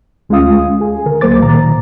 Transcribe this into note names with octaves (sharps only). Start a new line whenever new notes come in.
D2 G#3 C#4 F4 F5 D#6
G#4 G#5
D3 A#4
C#2 F#3 A#3 C5 D6 A6
A#2 D#3 A#5